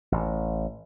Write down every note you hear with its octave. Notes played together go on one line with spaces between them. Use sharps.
A1